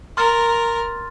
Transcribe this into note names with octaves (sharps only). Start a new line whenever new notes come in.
A#4 C6 F6 A6